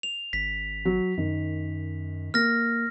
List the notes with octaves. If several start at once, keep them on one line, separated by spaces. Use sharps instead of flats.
F7
G#1 B6
F#3
F#2 D#3
A#3 F6 A#6